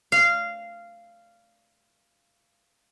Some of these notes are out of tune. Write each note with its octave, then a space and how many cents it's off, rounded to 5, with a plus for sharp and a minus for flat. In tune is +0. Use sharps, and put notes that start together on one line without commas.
F5 -15